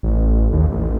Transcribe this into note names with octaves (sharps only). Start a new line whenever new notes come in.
A1
D#2
A1